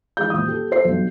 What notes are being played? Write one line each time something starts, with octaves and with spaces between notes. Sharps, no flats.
E3 G#3 G6
D#1 D#6
G4 A4
A4 C5 C7
B1 G2